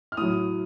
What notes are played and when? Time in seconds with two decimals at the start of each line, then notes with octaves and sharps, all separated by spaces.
0.12 F6
0.17 A2 F#3 D#6